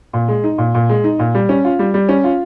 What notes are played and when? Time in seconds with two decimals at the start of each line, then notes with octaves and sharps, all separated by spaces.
0.13 A#2
0.28 G#3
0.44 D#4
0.58 A#2
0.74 A#2
0.89 G#3
1.04 D#4
1.19 A#2
1.35 G3
1.49 C#4
1.65 F4
1.79 G3
1.94 G3
2.09 C#4
2.24 F4